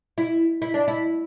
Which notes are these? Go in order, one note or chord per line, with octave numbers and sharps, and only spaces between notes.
E4
E4
D4
E4